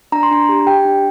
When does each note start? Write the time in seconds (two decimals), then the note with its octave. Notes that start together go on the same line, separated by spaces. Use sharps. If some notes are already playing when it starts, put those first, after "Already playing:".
0.12 D4 A#5
0.23 C6
0.31 D4 A#5
0.49 G4
0.67 G4 G5
0.85 D4